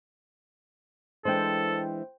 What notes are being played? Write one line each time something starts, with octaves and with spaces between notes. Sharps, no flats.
E3 G#3 D4 A4 C5 G5